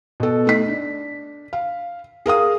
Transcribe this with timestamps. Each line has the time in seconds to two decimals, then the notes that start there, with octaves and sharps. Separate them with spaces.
0.20 B2 A4
0.47 A3 D#4 B6
0.68 D4
1.53 F5
2.26 G#4 A#4 F5 D#6